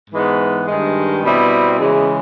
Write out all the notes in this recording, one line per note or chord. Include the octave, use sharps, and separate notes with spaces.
G#2 E3 G#3 B3
G2 D#3 G#3
B2 G3 C4 E4
C#3 E3 G#3